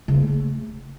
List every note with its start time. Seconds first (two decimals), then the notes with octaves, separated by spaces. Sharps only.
0.08 C#3
0.15 A#3
0.21 A3